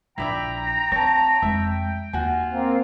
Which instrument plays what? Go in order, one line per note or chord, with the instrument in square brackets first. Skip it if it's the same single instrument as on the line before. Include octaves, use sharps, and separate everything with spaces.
[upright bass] A#1 [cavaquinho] E4 D5 E5 [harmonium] G5 [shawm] A#5
[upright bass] C4 [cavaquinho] C#5 A5
[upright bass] F2 G#3 [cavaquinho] E5
[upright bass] D#2 [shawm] F4 [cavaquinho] F#4 G#5
[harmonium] A#3 C4